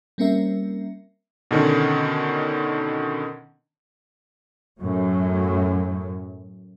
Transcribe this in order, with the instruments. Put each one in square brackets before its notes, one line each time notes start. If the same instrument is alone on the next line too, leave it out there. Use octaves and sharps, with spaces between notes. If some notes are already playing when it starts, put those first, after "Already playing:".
[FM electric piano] G3 A#3 C4 C#4 A#4 E5
[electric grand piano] B2 D3 D#3 C#4
[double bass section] F#2 A2 F#3